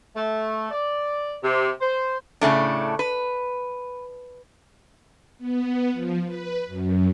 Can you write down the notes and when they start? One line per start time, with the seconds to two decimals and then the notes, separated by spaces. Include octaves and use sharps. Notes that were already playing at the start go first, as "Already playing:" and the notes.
0.16 A3
0.71 D5
1.43 C3
1.81 C5
2.41 A2 C#3 A3 D4
2.99 B4
5.38 B3
5.93 F3
6.24 B4
6.67 F#2